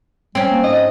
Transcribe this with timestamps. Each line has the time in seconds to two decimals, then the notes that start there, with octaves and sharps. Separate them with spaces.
0.35 G3 C4 C#4
0.50 A#3
0.64 G#2 D#5